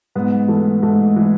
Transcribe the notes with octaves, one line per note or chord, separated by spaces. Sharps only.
G#2 B3
E3 A3
G#2 A3
E3